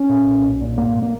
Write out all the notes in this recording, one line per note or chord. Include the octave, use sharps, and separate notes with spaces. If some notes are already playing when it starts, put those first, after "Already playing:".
Already playing: C#4
A#2
B1
B1
A#2
G#2 A#3
A#3